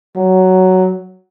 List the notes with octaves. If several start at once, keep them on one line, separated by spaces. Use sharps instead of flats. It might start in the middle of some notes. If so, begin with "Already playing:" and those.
F#3